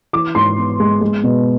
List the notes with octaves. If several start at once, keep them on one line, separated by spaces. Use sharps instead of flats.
E3 D6
G#2 C6
B3
G#3
G#3
B2